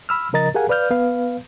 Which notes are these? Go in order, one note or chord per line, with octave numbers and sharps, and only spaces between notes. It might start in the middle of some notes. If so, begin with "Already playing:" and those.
B5 E6 F6
C#3 F3 A#4 D#5 A#5 A6
G4 G#4 A#4 F5 F#5 G#5
B4 D5 F5 F6 G6
B3 B4 F5